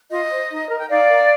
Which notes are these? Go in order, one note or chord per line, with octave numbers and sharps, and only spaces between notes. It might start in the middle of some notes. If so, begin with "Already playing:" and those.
F4 D#5
C5
D#4
A#4
G5
D#4 D5 F5
A#4